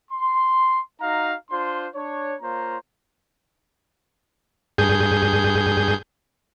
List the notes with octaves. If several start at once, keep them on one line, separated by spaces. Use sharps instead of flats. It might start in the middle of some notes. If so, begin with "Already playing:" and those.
C6
D#4 F#4 F5 A#5
D4 F4 C5 C6
D4 C#5
A#3 F4 C5 C#5 A#5
G2 G#4 G6